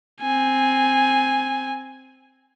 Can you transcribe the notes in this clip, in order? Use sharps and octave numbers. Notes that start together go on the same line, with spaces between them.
C4 G#5